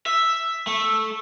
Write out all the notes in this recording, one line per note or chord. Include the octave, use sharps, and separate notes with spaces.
E5
A3